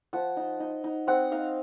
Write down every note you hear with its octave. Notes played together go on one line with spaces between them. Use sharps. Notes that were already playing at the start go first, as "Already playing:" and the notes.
F3 F#5
D#4
D#4
D#4
C4 F#5
D#4 F5